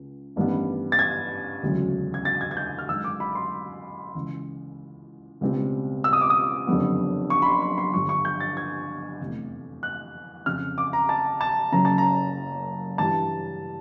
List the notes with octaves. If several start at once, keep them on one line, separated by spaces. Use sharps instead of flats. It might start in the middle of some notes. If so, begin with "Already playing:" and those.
Already playing: C#2
A1 G2 D#3 G3 B3
A6
G#6
E1 D2 C#3 F#3
G#6
A6
G#6
G#6
G6
F6
F#2 D#3 G#3 E6
D6
B5
C6
C#2 C#3 E3
C#2 B2 G3 C4
E6
D#6
D6
D#6
F#1 F2 D3 G3 B3
C#6
B5
C6
C6
C6
G1 G2 D3 F3 C#6
C#6
G6
A6
G#6
F1 E2 C3 E3 A3
F#6
F2 C#3 F3 F6
D6
A#5
A5
A5
F#1 F#2 C#3 F#3 A#5
A5
A#5
G2 E3 G3 A5